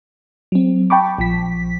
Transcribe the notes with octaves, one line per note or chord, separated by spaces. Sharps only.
F#3 C4
G5 A5 B5 C#6 D6
A#1 F3 B6